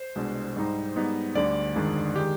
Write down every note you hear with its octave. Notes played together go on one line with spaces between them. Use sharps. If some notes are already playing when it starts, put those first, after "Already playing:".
Already playing: C5
C2 B2 G#3 D4
G#2 G3 C4 D#4
G#2 G3 B3 D#4
D2 D3 G3 D5
G1 F2 D#3 G#3 D4
D#3 G#3 D4 G4